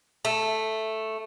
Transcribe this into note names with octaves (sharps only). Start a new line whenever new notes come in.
A3